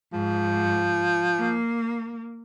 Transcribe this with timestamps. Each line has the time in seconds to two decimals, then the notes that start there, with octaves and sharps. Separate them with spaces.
0.13 G#2 F3
1.38 A#3